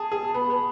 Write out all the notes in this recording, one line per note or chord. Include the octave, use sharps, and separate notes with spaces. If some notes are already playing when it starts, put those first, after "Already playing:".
Already playing: G#4 A5
G#4
B3 B5
B3